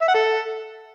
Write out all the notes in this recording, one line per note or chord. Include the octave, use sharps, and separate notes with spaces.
E5
F#5
A4